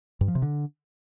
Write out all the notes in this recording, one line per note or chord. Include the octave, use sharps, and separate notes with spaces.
G2
F3
C3
D3